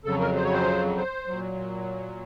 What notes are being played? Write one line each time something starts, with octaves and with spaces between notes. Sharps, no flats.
F2 C#3 F#3 A4
A#4
C5
C#5
C5
C5
A#2 F#3